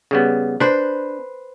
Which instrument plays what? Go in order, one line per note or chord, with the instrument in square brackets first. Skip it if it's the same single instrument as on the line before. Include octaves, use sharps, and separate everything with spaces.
[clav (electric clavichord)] C#3 G3 B3
[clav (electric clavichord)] D4 [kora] B4 C5